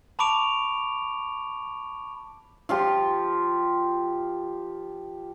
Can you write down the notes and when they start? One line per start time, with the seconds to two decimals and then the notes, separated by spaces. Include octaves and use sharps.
0.19 A5 B5 C#6 D6 D7 F7
2.69 F3 F4 G4